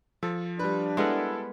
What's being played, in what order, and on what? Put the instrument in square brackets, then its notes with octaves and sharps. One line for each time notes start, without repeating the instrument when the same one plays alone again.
[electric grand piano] F3 [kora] A4
[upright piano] G3 B4 [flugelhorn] D4
[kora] G#3 B3 A#4 [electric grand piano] E4 A4